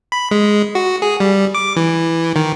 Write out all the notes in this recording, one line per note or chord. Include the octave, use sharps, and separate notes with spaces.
B5
G#3
F#4
G#4
G3
D6
E3
D#3